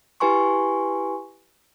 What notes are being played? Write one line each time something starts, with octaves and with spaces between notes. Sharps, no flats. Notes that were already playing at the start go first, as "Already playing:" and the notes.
E4 G4 B4 G#5 C6 C#6